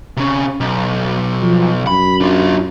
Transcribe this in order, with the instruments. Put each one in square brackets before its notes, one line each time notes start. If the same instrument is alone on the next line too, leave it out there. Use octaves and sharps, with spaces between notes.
[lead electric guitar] C3 C#4
B1
[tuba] F3
[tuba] F#2 [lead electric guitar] B5
[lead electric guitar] D4 F4